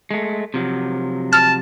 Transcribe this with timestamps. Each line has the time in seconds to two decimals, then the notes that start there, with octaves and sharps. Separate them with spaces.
0.11 G#3 A3
0.54 C3 F3 F#3
1.33 A5 F6